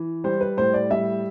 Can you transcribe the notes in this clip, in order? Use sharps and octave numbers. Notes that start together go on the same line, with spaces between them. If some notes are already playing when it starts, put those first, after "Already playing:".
Already playing: E3
G3 C5
B4
A2 C5
D5
G3 E5